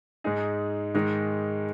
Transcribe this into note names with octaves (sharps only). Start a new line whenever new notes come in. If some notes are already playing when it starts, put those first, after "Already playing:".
G#2 G#3 D#4 G#4
G#2 D#3 G#3 D#4